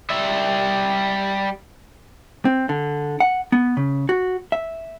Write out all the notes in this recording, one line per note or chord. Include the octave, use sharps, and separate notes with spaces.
G3 E5
C4
D3
F#5
B3
C#3
F#4
E5